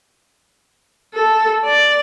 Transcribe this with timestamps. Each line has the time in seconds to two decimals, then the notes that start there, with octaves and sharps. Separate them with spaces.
1.14 A4
1.65 D5